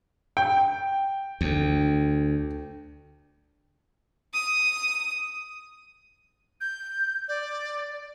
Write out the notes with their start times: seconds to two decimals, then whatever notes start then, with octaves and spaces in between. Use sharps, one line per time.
0.37 G5
1.41 D2
4.34 D#6
6.61 G6
7.28 D5